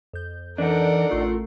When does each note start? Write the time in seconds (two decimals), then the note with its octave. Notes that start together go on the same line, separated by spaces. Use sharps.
0.13 F2 G6
0.58 E3 D4 D#4 A4 A#4 D5 F#5
1.10 A1 A3 F4 C7